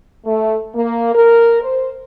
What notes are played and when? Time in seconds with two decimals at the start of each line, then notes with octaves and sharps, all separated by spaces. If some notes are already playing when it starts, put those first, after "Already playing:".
0.25 A3
0.75 A#3
1.14 A#4
1.61 C5